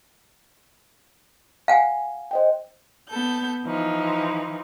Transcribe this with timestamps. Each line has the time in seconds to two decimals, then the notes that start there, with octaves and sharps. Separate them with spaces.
1.68 F5 F#5 G#5
2.31 C5 D#5 G5
3.09 B3 A4 G6
3.65 E3 F3 D#4